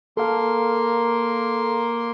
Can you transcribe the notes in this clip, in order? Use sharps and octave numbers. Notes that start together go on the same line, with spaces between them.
A#3 A4 A#4 F5 C6